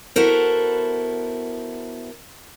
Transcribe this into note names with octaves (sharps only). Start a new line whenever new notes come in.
B3 E4 F#4 A4 A#4 C5